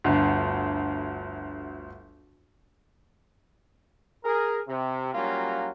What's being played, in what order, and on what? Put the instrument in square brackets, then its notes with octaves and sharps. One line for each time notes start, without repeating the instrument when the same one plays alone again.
[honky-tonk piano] G1 D2
[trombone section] G#4 A#4
C3
F#3 G3 A#3 C#4 F4